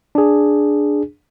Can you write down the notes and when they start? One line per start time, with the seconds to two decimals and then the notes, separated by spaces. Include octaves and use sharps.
0.15 D4 G#4